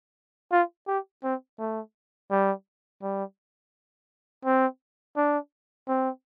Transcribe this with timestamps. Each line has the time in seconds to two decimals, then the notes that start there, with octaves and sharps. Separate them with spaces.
0.52 F4
0.87 G4
1.24 C4
1.59 A3
2.30 G3
3.02 G3
4.45 C4
5.16 D4
5.88 C4